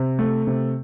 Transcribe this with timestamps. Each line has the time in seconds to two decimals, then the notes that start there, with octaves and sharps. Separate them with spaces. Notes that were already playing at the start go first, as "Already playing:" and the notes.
Already playing: C3
0.19 A3
0.47 C3